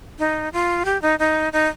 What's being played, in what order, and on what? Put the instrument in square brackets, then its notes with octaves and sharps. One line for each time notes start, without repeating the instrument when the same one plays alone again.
[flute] D#4
F4
G4
D#4
D#4
D#4